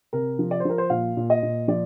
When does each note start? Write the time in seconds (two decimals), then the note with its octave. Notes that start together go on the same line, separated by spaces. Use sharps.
0.13 C3 A#4
0.39 F3
0.51 D5
0.60 C5
0.65 F3 A#4
0.78 C5
0.90 A#2 F5
1.17 A#2
1.30 D#5
1.43 A#2
1.68 F3 D5